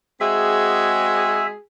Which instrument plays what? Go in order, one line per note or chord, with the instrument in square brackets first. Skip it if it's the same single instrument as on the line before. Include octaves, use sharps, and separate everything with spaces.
[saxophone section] G#3 C4 F#4 [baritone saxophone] G#4 [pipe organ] E5